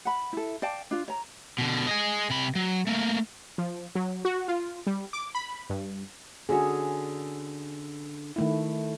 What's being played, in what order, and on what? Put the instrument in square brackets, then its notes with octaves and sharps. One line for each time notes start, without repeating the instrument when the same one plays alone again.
[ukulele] F#5 B5
E4 A4
D5 F5 G5 A5
D4 F4
C#5 A#5
[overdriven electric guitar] B2 D3
G#4 D#5
C3 B5
F#3
A3 A#3
[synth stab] F3
F#3
F#4
F4
G3
D6
B5
G2
[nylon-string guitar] D3 C#4 F#4 [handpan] G#4
[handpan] D#3 A3 E4